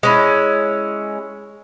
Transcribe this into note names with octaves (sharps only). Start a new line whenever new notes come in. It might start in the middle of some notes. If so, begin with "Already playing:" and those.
G#3 C#4 E4